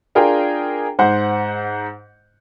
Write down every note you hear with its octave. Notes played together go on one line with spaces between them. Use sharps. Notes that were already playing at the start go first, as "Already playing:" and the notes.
D4 F4 G#4 A#4 G5
G#2 C5 F#5